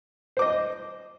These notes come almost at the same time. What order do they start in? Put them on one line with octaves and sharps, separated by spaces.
C5 D6 D#5